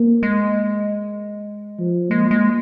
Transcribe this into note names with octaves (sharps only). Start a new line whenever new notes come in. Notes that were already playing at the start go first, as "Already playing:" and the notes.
Already playing: A#3
G#3
F3
G#3 A#3
G#3